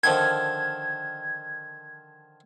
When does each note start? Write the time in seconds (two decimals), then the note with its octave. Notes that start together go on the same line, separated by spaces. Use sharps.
0.03 D3 D#3 F3 G#6